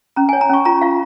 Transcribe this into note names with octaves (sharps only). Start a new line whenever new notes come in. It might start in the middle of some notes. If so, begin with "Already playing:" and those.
C#4 A#5
C#5 G#5
A#5
C#4 C#6
F4 A#5
F4 F5